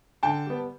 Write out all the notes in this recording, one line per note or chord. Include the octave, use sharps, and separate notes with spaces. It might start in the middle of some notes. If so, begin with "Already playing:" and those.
D3 G5 A5
G3 B3